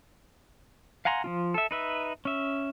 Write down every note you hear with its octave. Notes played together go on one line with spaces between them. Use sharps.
F5 F#5 G#5 A#5 C6
F3 D4 F4
A4 E5
D#4 B4 E5
C#4 E5